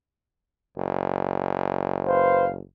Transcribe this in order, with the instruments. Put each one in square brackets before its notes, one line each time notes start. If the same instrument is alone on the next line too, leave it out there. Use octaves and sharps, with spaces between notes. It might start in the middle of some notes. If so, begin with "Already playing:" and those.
[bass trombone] F#1
[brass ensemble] B4 C5 F5